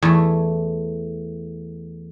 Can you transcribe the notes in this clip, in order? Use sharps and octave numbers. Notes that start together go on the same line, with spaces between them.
E2 A3